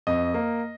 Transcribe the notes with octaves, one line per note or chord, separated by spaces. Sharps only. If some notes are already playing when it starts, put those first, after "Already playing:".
F2 D#5
A#3